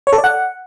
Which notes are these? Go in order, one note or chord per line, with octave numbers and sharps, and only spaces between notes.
C#5
A4
D5
F#5